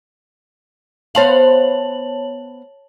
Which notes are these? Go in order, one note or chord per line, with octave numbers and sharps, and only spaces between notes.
B3 C5 C#5 F5 A5 F#7